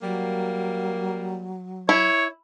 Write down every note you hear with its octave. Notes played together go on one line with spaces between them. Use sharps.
F#3 G3 A#3
E4 C#5